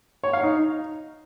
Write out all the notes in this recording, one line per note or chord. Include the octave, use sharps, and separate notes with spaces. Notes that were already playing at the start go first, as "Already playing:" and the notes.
C#5
F5
D#4